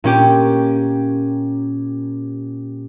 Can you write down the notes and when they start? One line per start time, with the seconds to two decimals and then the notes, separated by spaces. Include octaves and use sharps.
0.04 A#2 C#4 G4